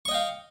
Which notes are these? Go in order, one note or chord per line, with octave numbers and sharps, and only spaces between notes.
D#5 F5 G5 C#6